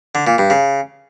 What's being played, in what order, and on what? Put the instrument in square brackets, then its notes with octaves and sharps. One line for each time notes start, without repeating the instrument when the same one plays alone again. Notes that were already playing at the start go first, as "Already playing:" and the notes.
[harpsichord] D3
A#2
G2
C#3